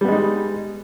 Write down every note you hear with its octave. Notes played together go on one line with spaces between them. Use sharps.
G3 G#3 B3 D#4